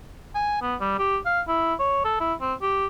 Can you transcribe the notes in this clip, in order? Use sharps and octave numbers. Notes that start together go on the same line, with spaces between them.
G#5
B3
G3
G4
F5
E4
C#5
A4
E4
C4
G4